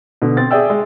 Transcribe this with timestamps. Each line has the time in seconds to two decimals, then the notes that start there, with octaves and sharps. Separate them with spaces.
0.22 B2 D3
0.37 C4 A6
0.51 G#4 D5 E5 G5 E6
0.70 G#3